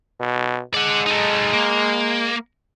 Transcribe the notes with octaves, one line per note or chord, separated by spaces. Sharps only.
B2
G#3 D5 F#5
D#4 A4
A#3